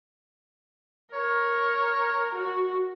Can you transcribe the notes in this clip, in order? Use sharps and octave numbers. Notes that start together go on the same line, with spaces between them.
A#4 C#5
F#4